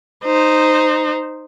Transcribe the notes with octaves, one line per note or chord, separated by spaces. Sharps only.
D#4 C5